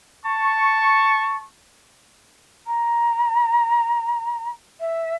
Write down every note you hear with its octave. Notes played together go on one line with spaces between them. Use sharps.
A5 C#6
A#5
E5